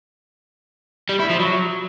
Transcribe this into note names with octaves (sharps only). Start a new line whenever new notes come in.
G3
E4
F3
F#3